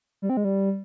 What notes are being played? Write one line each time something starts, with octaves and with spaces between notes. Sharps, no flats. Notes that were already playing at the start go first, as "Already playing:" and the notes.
G3
C4
G#3
G3